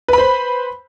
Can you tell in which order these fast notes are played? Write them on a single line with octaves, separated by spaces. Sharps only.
B4 B5 C5